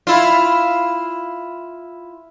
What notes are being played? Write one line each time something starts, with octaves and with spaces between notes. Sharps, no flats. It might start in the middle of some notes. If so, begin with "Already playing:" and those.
E4 F4